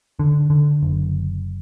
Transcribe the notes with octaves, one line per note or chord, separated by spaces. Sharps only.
D3
D3
F#1